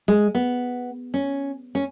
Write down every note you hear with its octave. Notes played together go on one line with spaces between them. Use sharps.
G#3
B3
C#4
C#4